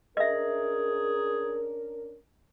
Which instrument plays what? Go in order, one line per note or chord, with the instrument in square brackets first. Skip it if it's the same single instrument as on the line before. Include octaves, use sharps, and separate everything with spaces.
[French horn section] C#4 D4 A#4 [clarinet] G#4 [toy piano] D#5 E5